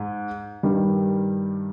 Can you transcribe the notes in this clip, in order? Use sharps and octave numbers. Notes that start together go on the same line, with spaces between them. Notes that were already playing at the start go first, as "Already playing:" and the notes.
Already playing: G#2
G2 D#3 G3